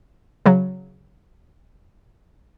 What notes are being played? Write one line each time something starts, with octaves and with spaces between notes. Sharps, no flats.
C#3 F#3